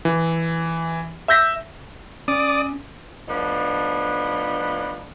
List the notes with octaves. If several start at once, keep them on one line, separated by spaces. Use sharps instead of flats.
E3
E5 E6 G6 A#6 B6
C#4 D5 D#6
A2 F3 B3 D4 D#4